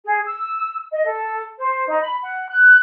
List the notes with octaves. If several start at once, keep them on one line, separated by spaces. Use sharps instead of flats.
G#4
E6
D#5
A4
C5
D#4
B5
F#5
F#6